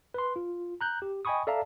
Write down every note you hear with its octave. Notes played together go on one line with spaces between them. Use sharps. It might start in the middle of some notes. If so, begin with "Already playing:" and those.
B4 C6
F4
A#5 F#6 G6
G4
D#5 G5 G#5 B5 C#6 D#6
A4 D5 E5 F5 A5 A#5